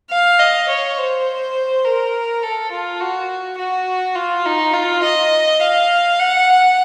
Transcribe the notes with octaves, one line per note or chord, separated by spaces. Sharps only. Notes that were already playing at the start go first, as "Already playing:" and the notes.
F5
D#5
C#5
C5
A#4
A4
F4
F#4
F#4
F4
D#4
F4
D#5
F5
F#5